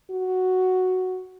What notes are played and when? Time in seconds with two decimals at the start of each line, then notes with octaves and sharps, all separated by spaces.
0.11 F#4